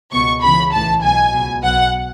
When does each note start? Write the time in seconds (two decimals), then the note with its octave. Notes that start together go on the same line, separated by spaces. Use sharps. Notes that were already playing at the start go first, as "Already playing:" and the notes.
0.12 C#2 B2 C#6
0.42 C#2 C#3 E3 B5
0.72 B1 A2 E3 A5
1.02 B1 B2 G#5
1.32 C#2 B2
1.63 B1 B2 F#5